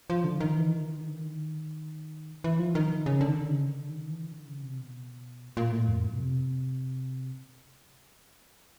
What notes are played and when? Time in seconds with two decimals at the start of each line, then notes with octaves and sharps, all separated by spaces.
0.10 F3
0.24 D3
0.40 D#3
0.57 E3
0.78 D#3
0.98 D3
1.19 D#3
2.44 E3
2.59 F3
2.75 D#3
3.06 C#3
3.21 D3
3.27 D#3
3.40 D3
3.48 C#3
3.68 D3
3.89 D#3
4.10 E3
4.32 D3
4.47 C#3
4.62 C3
4.79 B2
5.57 A#2
5.72 A2
5.88 F2
6.04 F#2
6.13 B2
6.19 C3